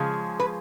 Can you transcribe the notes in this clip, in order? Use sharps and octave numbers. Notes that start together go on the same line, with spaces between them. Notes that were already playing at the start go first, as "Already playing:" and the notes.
Already playing: C#3 F3 G#3
B4